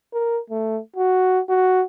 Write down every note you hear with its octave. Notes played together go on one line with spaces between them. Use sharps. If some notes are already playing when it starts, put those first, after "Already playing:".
A#4
A3
F#4
F#4